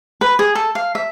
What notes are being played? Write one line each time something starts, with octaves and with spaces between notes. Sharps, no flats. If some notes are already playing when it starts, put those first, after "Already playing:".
B4
G#4
A4
F5
E5